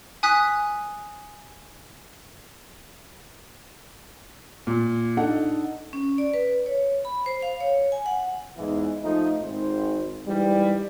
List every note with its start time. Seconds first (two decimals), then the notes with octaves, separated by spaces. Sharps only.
0.23 G#5 D#6 F#6 B6
4.67 A#2
5.17 D4 D#4 A4 D#5 F#5
5.93 C#4
6.18 D5
6.34 B4
6.66 C#5
7.05 B5
7.26 C5
7.42 F5
7.61 C#5
7.92 G#5
8.06 F#5
8.57 E2 G#2 E3 G#3
9.03 F3 A3 D#4
9.42 G#1 C5
10.27 G#2 E3 G3